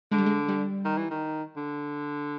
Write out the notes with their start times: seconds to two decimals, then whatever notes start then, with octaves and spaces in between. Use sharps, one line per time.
0.11 D3 G#3
0.18 G3
0.26 G#3
0.48 G3
0.85 D#3
0.97 E3
1.10 D#3
1.56 D3